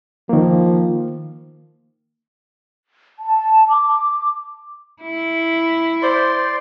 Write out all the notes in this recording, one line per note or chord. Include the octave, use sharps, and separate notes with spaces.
D#3 F3 A#3
A5
D6
E4
C5 D5 C6